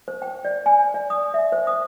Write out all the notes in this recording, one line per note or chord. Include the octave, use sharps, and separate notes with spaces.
C5
G5
D5
G#5
D5
D#6
E5
C5
D#6